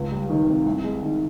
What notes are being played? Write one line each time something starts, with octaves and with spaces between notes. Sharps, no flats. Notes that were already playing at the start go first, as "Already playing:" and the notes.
Already playing: C#2
G3
D#3
C3
C2
G#3
D#3